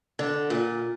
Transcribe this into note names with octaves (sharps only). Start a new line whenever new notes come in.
D3
A#2